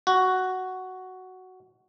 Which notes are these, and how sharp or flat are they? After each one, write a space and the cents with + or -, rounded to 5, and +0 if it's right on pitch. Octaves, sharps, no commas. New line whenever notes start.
F#4 +5